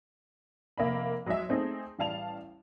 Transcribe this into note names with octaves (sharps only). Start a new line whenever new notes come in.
F1 A#3 E5 B5
F#3 G#3 G#4 D#5 E5
A3 C4 D#4 G#4
A1 G3 F5 A5 F7